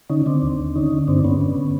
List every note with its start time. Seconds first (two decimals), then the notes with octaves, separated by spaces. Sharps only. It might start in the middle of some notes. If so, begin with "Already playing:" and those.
0.09 D3 C#4 D#4
0.26 D3 C4 D4
0.43 D#2
0.59 D#2
0.75 D3 C#4 D#4
0.92 D3
1.08 G2 C4 D4
1.24 G2 B3 C#4
1.41 D3
1.56 D3